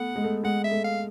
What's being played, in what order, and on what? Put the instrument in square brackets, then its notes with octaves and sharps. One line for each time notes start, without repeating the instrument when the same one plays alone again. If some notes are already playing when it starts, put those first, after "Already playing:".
Already playing: [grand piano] A3 B3 [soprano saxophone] F#5
[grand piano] G#3
A3
[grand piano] G#3 [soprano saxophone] F#5
[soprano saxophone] E5
[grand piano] A3
[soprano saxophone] F5